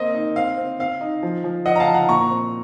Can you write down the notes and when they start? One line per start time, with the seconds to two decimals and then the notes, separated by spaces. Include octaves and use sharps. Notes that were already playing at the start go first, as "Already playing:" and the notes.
Already playing: A#3 C4 D#5
0.14 D#4
0.36 C4 F5
0.58 C4
0.79 C4 F5
1.01 D#4
1.23 F3
1.44 F3
1.66 F3 D#5 F#5
1.76 A#5
1.80 F5 A5
1.88 F3
1.94 F#5 A#5
2.08 A#2 A#5 C#6
2.30 C4